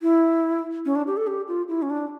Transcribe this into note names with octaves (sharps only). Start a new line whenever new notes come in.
E4
C#4
D4
G4
A4
G4
F4
E4
C#4
D4